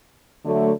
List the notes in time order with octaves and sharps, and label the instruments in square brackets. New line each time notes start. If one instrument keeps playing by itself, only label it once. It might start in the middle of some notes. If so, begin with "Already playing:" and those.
[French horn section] D3 F#3 A3